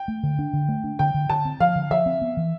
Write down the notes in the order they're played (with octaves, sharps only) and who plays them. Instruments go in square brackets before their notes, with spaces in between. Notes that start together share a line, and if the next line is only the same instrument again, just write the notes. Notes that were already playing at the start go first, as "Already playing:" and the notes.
Already playing: [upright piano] G5
[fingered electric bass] A3
D3
D4
D3
A3
D4
[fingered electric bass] D3 [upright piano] G5
[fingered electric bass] D3
[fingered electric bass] D3 [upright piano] A5
[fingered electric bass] C4
[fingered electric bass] F3 [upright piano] F5
[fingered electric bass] D3
[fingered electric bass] F3 [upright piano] E5
[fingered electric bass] C4
B3
E3